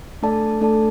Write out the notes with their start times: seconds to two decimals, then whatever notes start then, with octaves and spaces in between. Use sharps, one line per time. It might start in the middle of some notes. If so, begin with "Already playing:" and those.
0.22 A3 D4 A4 D5 A5
0.61 A3 D4 A4 D5 A5